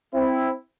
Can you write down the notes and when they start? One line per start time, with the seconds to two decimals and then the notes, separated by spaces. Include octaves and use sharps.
0.14 C4 E4